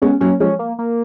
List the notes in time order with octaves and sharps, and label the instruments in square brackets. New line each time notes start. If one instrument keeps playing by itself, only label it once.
[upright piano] G#3 B3 [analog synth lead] C#4
[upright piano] F#3 A#3 [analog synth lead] C#4
[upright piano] F3 G#3 [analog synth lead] C#4
[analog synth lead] A#3
A#3